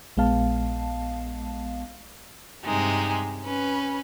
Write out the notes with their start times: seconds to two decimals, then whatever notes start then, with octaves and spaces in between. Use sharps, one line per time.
0.17 A#1 G#3 B3 F5 A5
2.65 G2 C3 G#3 D#4
3.43 C#4 B4